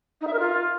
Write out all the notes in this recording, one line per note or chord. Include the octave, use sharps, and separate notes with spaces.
D#4
E5
A#4
F4